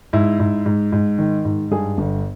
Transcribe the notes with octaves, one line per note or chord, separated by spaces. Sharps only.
G#2 E4
G#2
G#2
G#2
D#3
G#2
G2 G#4
G1